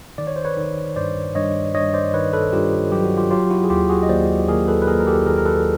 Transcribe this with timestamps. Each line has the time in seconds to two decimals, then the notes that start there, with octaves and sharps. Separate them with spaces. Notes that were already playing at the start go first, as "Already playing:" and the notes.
0.18 D#3 D5
0.27 C#5
0.36 C5
0.45 B4 C#5
0.57 D#3
0.96 G2 C5 D5
1.35 G2 C#5 D#5
1.75 G2 C#5 D#5
1.94 C5 D5
2.14 D#3 B4 C#5
2.33 A4 B4
2.53 G2 F4 G4
2.92 F#3 G4
3.05 F#4
3.17 F4 G4
3.31 F#3 F4 G4
3.50 E4 F#4
3.64 G#4
3.70 D#2 F4 G4
3.89 F#4 G#4
4.03 D#5
4.09 D#2 C5 D5
4.48 D#2 G#4 A#4
4.68 A4 B4
4.82 B4
4.87 D#2 G#4 A#4
5.00 A#4
5.07 G4 A4
5.26 D#3 G#4 A#4
5.38 A#4
5.46 A4 B4